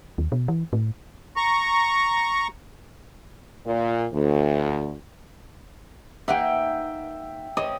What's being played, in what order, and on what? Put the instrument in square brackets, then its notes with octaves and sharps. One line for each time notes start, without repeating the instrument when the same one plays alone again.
[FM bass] D#2
B2
E3
A2
[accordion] A#5 C#6
[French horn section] A#2
D2
[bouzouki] A#3 D#4 F#5 [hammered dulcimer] E5 G5
[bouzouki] C4 C#4 [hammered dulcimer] D#5